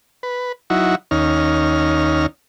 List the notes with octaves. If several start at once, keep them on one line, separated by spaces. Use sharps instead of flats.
B4
F#3 D#4 E4 F#4
D#2 C#4 D#4 F6